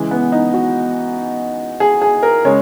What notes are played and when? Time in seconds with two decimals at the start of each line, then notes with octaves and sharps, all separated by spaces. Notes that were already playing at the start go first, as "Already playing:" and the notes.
Already playing: C#3 E3 G#3
0.11 B3
0.32 D#4
0.54 F#4
1.80 G#4
2.02 G#4
2.23 A#4
2.45 C#3 G#3 C#5